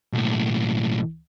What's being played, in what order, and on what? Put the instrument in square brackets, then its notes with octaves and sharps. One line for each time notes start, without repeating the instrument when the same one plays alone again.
[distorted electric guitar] B1 A2